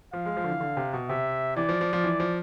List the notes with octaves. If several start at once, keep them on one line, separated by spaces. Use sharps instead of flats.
F3 F5
G#3
F3
D3
E3
D3
C3
B2
C3 E5
E3 D5
F3
F3
F3
E3
F3